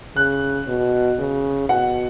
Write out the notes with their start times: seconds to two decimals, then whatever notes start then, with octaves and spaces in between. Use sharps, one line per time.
0.16 C#3 F#6
0.68 B2
1.19 C#3
1.69 B2 F#5